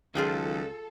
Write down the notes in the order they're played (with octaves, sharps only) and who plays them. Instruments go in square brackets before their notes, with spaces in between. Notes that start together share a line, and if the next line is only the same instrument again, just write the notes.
[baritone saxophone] C#2 [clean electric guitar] D#3 F#3 [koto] F4 G#4 G5 [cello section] A4